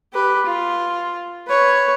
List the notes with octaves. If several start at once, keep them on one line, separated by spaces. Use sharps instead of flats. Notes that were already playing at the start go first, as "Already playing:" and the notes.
G4 B4
F4
B4 C#5